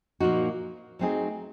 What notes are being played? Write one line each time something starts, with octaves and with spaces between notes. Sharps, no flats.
A#2 F3 A#3 D#4 F#4
F#3 A3 C4 D#4 G#4